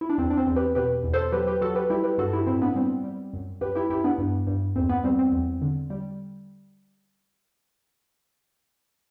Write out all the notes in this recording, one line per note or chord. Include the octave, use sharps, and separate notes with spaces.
E4
D4
E2 C4
D4
C4
E2
G4 B4
B2 G4 B4
E2
A4 C5
F#3 G4 B4
G4 B4
F#3 F#4 A4
G4 B4
G3 E4 G4
G4 B4
G2 F#4 A4
E4 G4
A2 C4 E4
B3 D4
G3 C4
G3
F#2
F#2 G4 B4
E4 G4
F#2 E4 G4
B3 D4
G2
G2
E2 C4
B3
G3 C4
C4
E2
D3
G3